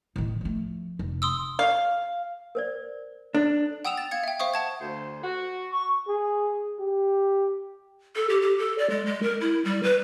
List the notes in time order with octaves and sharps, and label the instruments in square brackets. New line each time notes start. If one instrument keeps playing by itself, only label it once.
[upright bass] A2 D#3
F3 A3
F1
[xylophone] C6 D#6 E6
[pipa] F5
[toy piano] A#4 C5 D5
[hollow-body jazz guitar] D4 [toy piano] A4
[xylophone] F#5 G5 D#6 E6 E7 F7
A6
F5 G#6 C#7
E5 G5
C5 E5 F5 C#6 D#6
F#5 A5 G#6
[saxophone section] D2 C5
F#4
[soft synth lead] C#6
[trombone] G#4
G4
[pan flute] A4
G4
G4
A4
D5
G#3
G#3
A#4
E4
G3
B4